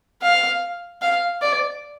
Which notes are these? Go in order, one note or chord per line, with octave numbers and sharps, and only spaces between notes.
F5
F5
D5